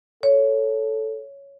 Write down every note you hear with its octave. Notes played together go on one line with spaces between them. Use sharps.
A4 C#5